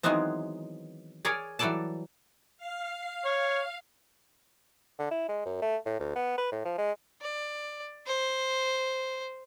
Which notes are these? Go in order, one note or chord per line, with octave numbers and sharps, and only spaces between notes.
D#3 E3 F#3 G#3 B3 C4
G#4 A#4 C#5 D5
E3 F#3 G3 A4 D5 A5
F5
C#5
D3
E4
G#3
F#2
A3
A2
D2
B3
B4
A2
F3
G#3
D5
C5